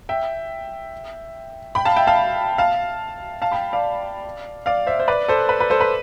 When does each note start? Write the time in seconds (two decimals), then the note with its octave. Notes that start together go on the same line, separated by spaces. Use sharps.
0.09 E5 G5
1.75 G5 B5
1.85 F5 A5
1.96 E5 G5
2.07 F5 A5
2.58 F5 A5
3.42 F5 A5
3.52 G5 B5
3.73 D5 F5
4.66 D5 F5
4.87 C5 E5
5.00 C5
5.08 B4 D5
5.28 A4 C5
5.49 B4
5.60 B4
5.70 A4 C5
5.81 B4